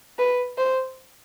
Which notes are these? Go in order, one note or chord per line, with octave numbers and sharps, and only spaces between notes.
B4
C5